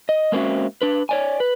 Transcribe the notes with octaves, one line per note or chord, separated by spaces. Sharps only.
D#5
G#3 A#3 C4 C#4 F#4 E5
D4 B4
C#5 D5 G#5
B4